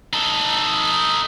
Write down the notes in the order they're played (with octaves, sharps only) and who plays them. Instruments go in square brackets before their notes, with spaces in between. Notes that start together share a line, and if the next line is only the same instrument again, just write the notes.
[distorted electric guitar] D#4 A4